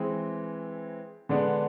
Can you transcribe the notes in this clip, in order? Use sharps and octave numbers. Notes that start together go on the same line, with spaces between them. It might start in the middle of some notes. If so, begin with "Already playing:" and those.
Already playing: E3 G#3 C4 E4
D3 G#3 B3 D4